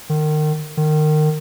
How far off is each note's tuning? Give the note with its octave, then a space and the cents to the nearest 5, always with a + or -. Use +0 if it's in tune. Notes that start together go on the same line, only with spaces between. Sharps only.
D#3 -30
D#3 -25